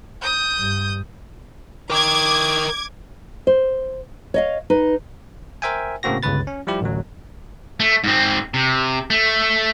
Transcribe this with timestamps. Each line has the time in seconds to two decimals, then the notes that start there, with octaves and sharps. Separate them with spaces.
0.22 D#6 G6
0.60 G2
1.90 A#4 G5 D6 G#6
3.47 C5
4.34 C#5 D#5 F5
4.70 D#4 B4
5.62 A#4 C5 E5 G5 G#5
6.03 A2 C#3 A#3 C4 F#4 A#6
6.23 G1 C#2 C#3 B4 A6
6.47 C#4
6.67 F3 G3 E4 G4
6.81 A1 D2 F#3
7.80 A3
8.04 G#2 C4
8.54 C3
9.10 A3